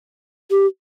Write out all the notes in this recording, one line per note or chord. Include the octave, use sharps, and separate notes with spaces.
G4